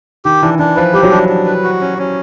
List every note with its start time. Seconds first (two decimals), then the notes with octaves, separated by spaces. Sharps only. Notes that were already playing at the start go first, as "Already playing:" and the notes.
0.25 D#3 G4
0.43 E3 D4
0.59 E3 D4
0.76 F3 B4
0.93 G3 G4
1.03 F#3
1.11 G3 D4
1.29 D4
1.46 B4
1.64 F#4
1.81 C#4
1.98 C#4